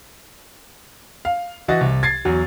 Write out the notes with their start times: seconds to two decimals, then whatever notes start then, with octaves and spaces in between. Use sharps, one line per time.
1.25 F5
1.68 E3 F#4 D#5 A6
1.81 C2
2.03 G#6 A6 C7
2.25 E2 F#3